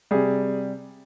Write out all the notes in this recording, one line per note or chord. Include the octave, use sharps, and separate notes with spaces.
C3 G3 G#4